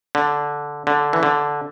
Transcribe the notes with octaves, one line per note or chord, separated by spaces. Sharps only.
D3
D3
E3
D3